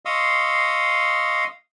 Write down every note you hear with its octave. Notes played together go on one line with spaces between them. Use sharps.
D#5 F5 C6 C#6 D#6 E6